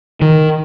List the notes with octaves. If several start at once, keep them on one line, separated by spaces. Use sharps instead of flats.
D#3